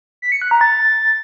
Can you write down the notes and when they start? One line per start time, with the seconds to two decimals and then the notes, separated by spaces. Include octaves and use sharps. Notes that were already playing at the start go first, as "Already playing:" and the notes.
0.22 B6
0.32 C#7
0.42 F#6
0.51 A#5
0.61 A6